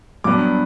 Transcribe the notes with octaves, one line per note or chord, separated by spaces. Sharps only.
G2 F#3 B3 D4 D6